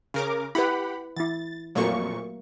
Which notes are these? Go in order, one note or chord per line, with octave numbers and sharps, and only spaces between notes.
C#3 A#4 D6
E4 G4 B4 F#5 B5
E3 E4 A6
F2 A#2 F#3 A3 A#3 C#6